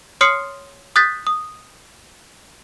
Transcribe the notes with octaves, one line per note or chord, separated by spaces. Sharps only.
C#5 C6 D#6 F6 C7 C#7
D#6 F#6 G6 A6 B6
D#6